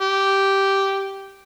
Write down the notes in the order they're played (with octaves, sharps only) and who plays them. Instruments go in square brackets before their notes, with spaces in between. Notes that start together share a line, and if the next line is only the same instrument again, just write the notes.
[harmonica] G4